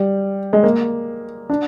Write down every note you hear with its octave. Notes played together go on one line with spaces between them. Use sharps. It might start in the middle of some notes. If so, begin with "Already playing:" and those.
Already playing: G3
G#3
A#3
D4